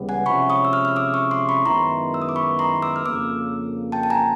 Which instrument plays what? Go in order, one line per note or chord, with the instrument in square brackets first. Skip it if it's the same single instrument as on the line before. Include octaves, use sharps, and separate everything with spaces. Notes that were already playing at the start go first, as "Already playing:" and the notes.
Already playing: [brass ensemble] C#2 C#3 E3 G3 B3
[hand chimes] F#5 G#5
[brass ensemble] C3 F3 G#3 C#4 E4 [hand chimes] B5 C#6
[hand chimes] C#6 D#6
E6
D#6 F6
F6
D6 E6
C#6 D#6
C6 D6
B5 C#6
[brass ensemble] F#2 D#3 G#3 B3 E4 [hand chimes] A#5 C6
[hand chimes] E6
D#6
D6
B5 C#6
A#5 C6
D6 E6
F6
[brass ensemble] F2 C#3 F3 A#3 [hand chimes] D6 E6
[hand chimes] G5 A5
A5
G#5 A#5